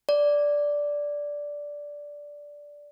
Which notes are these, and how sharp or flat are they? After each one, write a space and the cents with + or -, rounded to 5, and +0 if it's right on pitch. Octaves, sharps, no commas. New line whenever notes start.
D5 -5